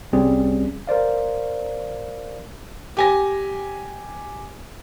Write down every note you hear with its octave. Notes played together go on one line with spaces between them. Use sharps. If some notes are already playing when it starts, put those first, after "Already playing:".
C2 G3 C4 C#4 G#4
A#4 C5 D5 F5
G4 G#5 A#6